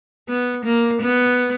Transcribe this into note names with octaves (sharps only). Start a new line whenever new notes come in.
B3
A#3
B3